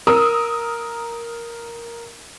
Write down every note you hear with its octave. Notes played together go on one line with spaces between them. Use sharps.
A#4 D#6 E6